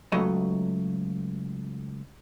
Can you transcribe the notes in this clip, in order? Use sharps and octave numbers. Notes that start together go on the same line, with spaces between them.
C#2 F#3 A3 D#5